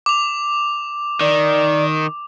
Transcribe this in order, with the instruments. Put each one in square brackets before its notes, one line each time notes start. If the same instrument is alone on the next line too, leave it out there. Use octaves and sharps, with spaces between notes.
[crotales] D6 F7
[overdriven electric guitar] D#3 [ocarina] D5